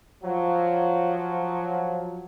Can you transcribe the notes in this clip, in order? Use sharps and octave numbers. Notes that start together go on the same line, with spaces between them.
F3 F#3